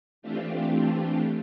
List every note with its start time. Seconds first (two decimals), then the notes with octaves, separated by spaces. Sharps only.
0.22 E3 A3 C4 D4 F4 G4